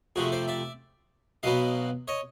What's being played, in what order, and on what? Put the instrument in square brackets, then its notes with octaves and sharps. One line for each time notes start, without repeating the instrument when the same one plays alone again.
[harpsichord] F2 C3 F3 A3 F#4 G#4
C5 D5
D5 E5
B1 B2 F#3 B3 D#5 F5
C#5 D#5